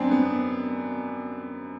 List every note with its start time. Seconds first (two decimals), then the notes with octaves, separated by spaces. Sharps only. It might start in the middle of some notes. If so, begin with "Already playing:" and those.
Already playing: F#2 B3 C4 D4
0.11 B3